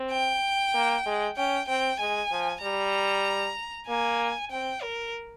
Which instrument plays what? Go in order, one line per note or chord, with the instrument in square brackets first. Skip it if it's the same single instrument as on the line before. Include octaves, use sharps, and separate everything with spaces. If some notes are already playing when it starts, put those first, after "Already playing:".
Already playing: [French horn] C4
[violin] G5
[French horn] A#3
G#3
[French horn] C#4 [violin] G5
[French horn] C4 [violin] G5
[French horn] G#3 [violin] G#5
[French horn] F3
[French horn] G3 [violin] A#5
[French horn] A#3 [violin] G#5
[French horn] C4 [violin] G5
[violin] A#4